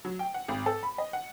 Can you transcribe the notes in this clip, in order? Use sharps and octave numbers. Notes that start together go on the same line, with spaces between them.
F#3
G5
F#5
G#1
A4
B5
D#5
F#5